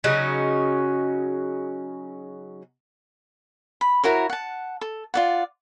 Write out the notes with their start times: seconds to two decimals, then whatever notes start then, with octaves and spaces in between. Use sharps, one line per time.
0.04 C#3 F#3 C#4 D#4
3.81 B5
4.04 E4 F#4 A#4 C#5
4.30 F#5 A5
4.81 A4
5.14 F4 D5 F#5